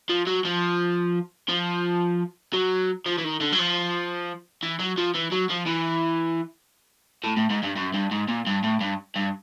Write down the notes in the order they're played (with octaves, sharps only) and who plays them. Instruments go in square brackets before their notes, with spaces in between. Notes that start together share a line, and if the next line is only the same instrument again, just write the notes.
[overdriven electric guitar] F3
F#3
F3
F3
F#3
F3
E3
D#3
D3
F#3
F3
E3
F#3
F3
E3
F#3
F3
E3
A2
A2
G#2
G2
F#2
G2
G#2
A#2
G2
A2
G2
G2